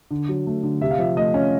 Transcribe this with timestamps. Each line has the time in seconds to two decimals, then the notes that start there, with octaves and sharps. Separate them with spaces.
0.11 D3
0.29 F#3
0.47 A3
0.63 D3
0.81 C3 E5
0.91 F5
0.99 F3 E5
1.17 A3 D#5
1.34 C#4